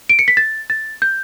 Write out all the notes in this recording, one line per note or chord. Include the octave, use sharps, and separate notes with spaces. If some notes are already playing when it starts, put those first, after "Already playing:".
D7
C#7
B6
A6
A6
G6